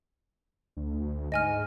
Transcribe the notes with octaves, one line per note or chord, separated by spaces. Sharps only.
D2
G#2 D#5 G#5 F6